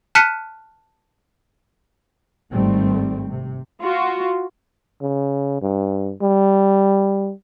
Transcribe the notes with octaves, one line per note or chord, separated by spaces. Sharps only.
A5 F6 F#6 B6 C#7 D#7
G#1 G2 D#3 G3 A3 C4
C3
F4 F#4
C#3
G2
G3